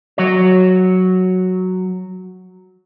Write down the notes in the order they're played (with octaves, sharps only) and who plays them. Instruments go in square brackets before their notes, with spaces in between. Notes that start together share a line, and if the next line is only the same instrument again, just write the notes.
[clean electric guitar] F#3 F#4 C#5